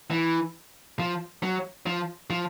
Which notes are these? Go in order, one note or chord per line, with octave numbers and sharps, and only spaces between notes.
E3
F3
F#3
F3
F3